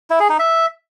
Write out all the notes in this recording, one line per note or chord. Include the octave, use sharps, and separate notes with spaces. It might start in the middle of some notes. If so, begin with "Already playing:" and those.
E4
G#4
D#4
E5